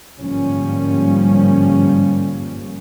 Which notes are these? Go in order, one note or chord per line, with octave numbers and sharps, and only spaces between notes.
G1 G#2 F3 G3 A#3 C#4